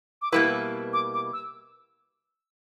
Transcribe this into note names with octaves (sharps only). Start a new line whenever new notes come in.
D6
B2 G3 A#3 E4 B4 E6
D6
D6
E6